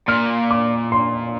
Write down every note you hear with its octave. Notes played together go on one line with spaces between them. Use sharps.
A#2 F6
D6
C6